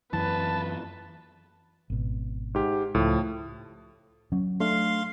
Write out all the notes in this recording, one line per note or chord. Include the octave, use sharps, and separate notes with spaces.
F#2 E3 B4 A5
G#1 B2
G#2 G4
C#2 A2 F3
F#3 C#4
A3 D4 F5 C6